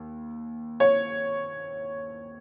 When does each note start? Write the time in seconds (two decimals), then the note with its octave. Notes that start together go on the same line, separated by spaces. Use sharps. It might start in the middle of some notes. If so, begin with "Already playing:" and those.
Already playing: D#2
0.80 C#5